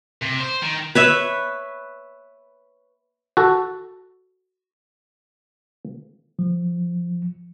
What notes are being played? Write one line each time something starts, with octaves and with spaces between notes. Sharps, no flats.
C3
C5
D#3
B4 C#5 E5
F#4 A4
F3